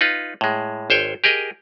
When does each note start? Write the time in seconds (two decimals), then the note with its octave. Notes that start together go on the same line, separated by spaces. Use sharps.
0.01 D#4 F4 B4
0.41 A2 G#3
0.90 G#1 C5 C#5 G5
1.24 G4 G#4 A#4 D#5